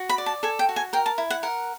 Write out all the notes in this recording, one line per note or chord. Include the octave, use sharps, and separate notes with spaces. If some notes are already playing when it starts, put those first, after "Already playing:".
Already playing: F#4
B5
D5
A5
A4 G#5
G5
F#4
G#5
A#4 G5
A5
E4
F#5
A#4 F#5